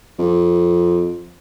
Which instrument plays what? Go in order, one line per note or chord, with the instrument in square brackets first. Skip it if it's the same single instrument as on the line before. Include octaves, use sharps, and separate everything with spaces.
[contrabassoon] F2